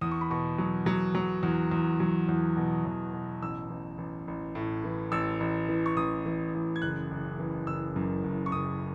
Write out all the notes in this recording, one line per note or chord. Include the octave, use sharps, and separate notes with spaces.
E2 D#6
C#6
B5
B2 C#6
F#3
F#3
F#3
E2
E2
F#3
E2
B2
E2
B2
A1 E6
A1
A1
A1
A2
E3
A1 E6
A1
E3
C#6
A1 D#6
E3
A1
G#6
F#1 F#6
F#1
E3
F#1 E6
F#2
F#1
C#6
F#1 D#6